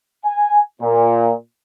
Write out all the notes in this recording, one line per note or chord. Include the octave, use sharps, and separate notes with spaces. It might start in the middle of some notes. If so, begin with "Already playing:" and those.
G#5
A#2